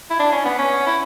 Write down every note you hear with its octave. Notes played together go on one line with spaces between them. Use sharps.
E4
D4
C#4
B3
C#4
E4